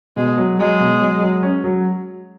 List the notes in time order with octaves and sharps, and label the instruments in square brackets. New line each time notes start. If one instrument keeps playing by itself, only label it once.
[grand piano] B2 [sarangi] G#3
[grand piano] F#3
[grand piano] F#3 [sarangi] G#3
[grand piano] B2
F#3
F#3
C#4
F#3